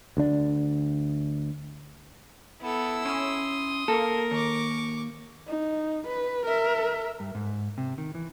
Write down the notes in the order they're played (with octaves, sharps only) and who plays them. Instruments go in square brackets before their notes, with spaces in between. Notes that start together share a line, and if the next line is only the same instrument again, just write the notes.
[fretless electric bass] D2 D3 D4
[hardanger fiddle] B3 A4 [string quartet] E4 E6
[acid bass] C#4 [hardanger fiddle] C6 D#6
[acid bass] A#3 [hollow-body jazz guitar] A4 [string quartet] A#4
[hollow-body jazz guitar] D#2 [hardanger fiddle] C#6 D6
[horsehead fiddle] D#4
B4
A#4 E5
[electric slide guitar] G2
G#2
C3
D#3
E3